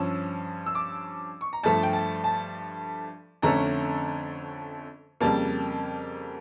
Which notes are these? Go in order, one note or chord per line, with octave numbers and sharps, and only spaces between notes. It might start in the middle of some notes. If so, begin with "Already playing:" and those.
Already playing: G2 F3 C#4 E6
E6
D6
C#6
A#5
G2 F3 A3 A5
G5
A5
A5
F2 D3 A3 C#4 A#5
F2 C#3 G3 A#3 A5